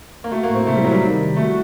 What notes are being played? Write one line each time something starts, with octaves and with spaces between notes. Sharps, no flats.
A#3
A3 F#4
A#3
A2 C4
C3 A3
G3
C3 F#3
G3
D#3
D#3
A3 F#4